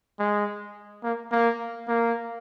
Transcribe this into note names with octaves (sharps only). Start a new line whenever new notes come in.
G#3
A#3
A#3
A#3